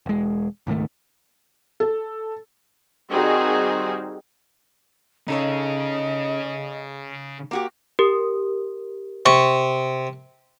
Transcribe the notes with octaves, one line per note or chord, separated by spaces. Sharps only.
E1 G#3
C#2 G#2 D#3 A3
A4
D#3 G3 C4 D#4 F#4 G#4
C#3 D#4 A4 C#5 D#5
A#3 F#4 G4
G4 A#4
C3 C#6